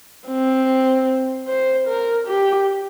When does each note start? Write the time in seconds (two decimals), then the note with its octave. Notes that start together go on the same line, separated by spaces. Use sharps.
0.28 C4
1.48 C5
1.87 A#4
2.27 G4